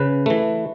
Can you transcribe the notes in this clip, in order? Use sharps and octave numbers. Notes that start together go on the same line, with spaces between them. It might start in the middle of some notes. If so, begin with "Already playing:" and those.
Already playing: C#3 B4
E3 A3